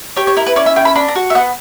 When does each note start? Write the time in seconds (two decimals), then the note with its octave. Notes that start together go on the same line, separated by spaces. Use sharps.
0.16 G4 C#5
0.27 C#5
0.37 E4 A#4
0.47 B4
0.56 C#4 D5
0.66 E5
0.76 E4 G5
0.85 B5
0.95 D4 B5
1.08 A#5
1.16 F#4
1.30 E5
1.35 B3 F#5